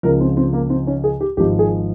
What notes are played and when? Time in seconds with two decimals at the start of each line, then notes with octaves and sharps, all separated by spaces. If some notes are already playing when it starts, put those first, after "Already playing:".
0.03 C#2 C#3 F3 A#4
0.21 C4
0.37 C4
0.53 A#3
0.70 C4
0.87 C#4
1.04 G#4
1.21 G4
1.37 G#1 G#2 F3 G4
1.59 G#4